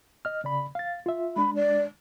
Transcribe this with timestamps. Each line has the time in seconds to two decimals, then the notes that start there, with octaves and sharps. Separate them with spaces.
0.25 D#5 F6
0.44 C#3 D5 B5
0.75 F5 A6
1.06 F4 E5
1.36 G#3 D4 B5
1.55 D5